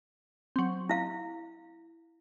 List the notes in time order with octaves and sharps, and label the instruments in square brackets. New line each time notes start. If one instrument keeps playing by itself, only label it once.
[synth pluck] F#3 C4
[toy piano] E4 F5